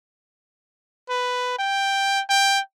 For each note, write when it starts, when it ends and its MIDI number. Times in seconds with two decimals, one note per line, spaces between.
1.09 1.57 71
1.59 2.22 79
2.30 2.60 79